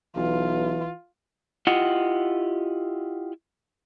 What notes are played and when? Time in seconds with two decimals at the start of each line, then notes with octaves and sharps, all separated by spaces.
0.16 B1 E3 F4
1.67 E4 F4 G4 D#5 F#5